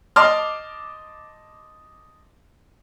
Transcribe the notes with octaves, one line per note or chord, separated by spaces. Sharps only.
D#5 A5 C6 D6 F6